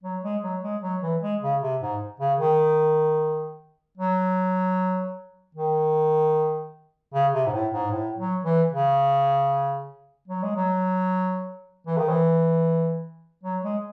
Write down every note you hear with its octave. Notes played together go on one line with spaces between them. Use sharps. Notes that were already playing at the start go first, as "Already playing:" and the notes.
F#3
G#3
F#3
G#3
F#3
E3
G#3
C#3
C3
G#2
C#3
D#3
F#3
D#3
C#3
C3
G#2
A2
G#2
A2
F#3
E3
C#3
F#3
G#3
F#3
E3
D#3
E3
F#3
G#3